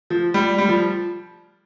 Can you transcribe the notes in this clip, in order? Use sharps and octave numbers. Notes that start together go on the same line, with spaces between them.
F3
G3
G3
F3